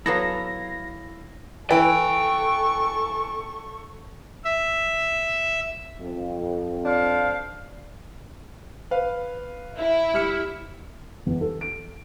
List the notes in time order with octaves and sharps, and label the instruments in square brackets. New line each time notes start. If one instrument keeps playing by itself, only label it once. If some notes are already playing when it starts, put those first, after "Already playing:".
[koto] F#3 B3 A4 [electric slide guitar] E4 F5 [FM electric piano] A#6
[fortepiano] E3 [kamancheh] A4 C#6 [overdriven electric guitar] G5
[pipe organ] E5
[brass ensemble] F2
[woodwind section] D4 C5 F5
[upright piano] B4 F5
[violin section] E4
[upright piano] G3 F6 C#7
[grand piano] E2
A4
D7